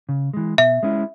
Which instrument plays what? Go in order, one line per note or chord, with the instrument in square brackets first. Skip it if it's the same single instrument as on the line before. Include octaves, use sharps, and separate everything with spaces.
[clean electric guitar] C#3
E3 G#3
[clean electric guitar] B2 [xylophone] E5
[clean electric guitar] G#3 C#4 E4